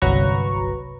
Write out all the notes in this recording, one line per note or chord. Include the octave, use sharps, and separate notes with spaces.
G1 C2 F#3 B4 A#5 C#6